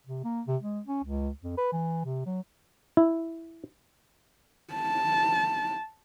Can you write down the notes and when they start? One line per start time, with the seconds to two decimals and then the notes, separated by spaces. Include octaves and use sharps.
0.06 C3
0.24 A#3
0.47 C3
0.62 G#3
0.87 C#4
1.04 C#2
1.44 F2
1.58 B4
1.72 E3
2.05 C3
2.26 F#3
2.97 E4
4.74 A5